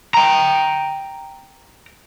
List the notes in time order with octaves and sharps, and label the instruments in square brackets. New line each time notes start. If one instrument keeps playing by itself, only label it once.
[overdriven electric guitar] G5 A#5